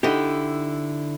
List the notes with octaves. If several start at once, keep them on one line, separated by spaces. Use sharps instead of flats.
D3 D#4 E4 G4